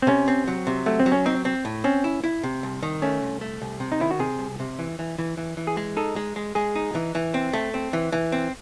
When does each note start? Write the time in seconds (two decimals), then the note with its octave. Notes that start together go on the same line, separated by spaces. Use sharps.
0.02 C4
0.07 C3 C#4
0.28 C4
0.48 F#3
0.67 C3
0.86 F#3 A3
0.99 C4
1.06 F#3
1.12 C#4
1.26 C4 D#4
1.45 C4
1.65 A2
1.84 C4 C#4
2.04 E4
2.24 E4
2.43 C3
2.63 C2
2.83 D#3
3.02 A3 C#4
3.22 C2
3.41 A3
3.62 C2
3.80 C3
3.92 D#4
4.00 D#3 E4
4.11 F#4
4.19 C3 G#4
4.39 C2
4.60 C3
4.79 E3
4.99 E3
5.19 E3
5.37 E3
5.57 E3
5.67 G#4
5.77 G#3
5.97 D#4 A4
6.16 G#3
6.36 G#3
6.55 G#3 G#4
6.75 D#4
6.95 E3
7.15 E3
7.34 C4
7.53 A3
7.74 C4
7.93 E3
8.12 E3
8.32 C4